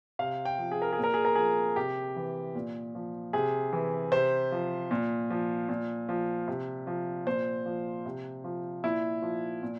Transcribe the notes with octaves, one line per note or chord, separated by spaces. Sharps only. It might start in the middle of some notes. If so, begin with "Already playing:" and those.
C3 F5
G5
F3
G#4
A#4
G#4
A#2
A#4
G#4
A#4
F3 G#4
C3 G4
E3
A#2
F3
C3 G#4
E3
C3 C5
F3
A#2
F3
A#2
F3
C3
F3
A#2 C5
F3
C3
F3
A#2 E4
F3
A#2